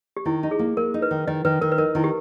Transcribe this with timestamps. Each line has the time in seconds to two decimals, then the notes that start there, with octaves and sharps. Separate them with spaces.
0.17 G4
0.25 D#3 E4
0.43 D#4
0.51 G#4
0.59 A#3
0.77 A#3 A#4
0.94 D#4
1.02 B4
1.11 D#3
1.27 D#3 D#5
1.45 D#3 B4
1.61 D#3 A#4
1.72 B4
1.78 D#4 A#4
1.95 D#3 E4
2.04 G4